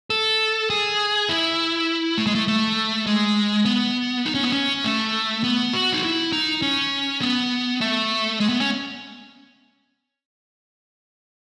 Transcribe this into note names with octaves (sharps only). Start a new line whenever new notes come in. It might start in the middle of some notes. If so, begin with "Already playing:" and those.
A4
G#4
E4
A3
G#3
A3
A3
G#3
B3
D#4
C#4
B3
C#4
A3
B3
F#4
D#4
E4
D#4
C#4
B3
A3
G#3
B3
C#4